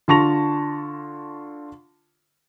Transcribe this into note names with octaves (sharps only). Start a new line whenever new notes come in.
D3 F4 A5 C#6 A#6 F7